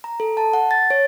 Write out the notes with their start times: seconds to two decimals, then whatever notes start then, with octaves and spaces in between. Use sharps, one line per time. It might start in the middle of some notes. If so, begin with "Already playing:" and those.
0.04 A#5
0.20 A4
0.37 A5
0.53 F#5
0.71 A6
0.90 C#5